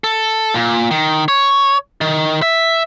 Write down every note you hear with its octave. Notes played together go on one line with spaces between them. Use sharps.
A4
A#2
D#3
C#5
D#3
E5